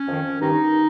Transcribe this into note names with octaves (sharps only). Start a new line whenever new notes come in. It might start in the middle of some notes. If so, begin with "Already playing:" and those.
Already playing: C#4
F2 D#3
G2 D#3 D#4